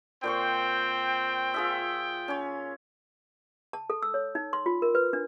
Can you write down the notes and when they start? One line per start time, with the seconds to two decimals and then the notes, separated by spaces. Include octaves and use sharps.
0.23 A#2 C4 C5 G5 C#6
1.54 F4 G#4 E5
2.28 C#4 C#5
3.73 A5
3.90 A4
4.02 E6
4.14 C#5
4.35 D#4
4.53 C6
4.66 F4
4.82 A#4
4.95 B4
5.13 D4